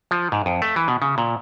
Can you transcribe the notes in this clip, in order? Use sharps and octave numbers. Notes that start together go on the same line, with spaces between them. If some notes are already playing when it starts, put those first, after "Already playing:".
F3
G#2
F2
A3
E3
B2
C#3
A#2